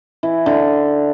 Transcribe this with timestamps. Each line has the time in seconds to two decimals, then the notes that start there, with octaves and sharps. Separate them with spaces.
0.23 E3
0.46 D3